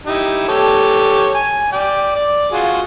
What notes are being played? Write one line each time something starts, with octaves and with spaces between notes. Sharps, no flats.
D#4 E4 G4
G4 A4 C#5
G#5
D5 G5
D5
F4 F#4 G#4